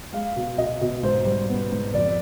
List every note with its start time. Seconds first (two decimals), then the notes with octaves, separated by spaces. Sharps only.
0.13 G#3 F5
0.36 B2
0.58 B2 D#5
0.81 B2
1.03 G#2 C5
1.25 G3
1.49 B3
1.71 G#2
1.94 F2 D5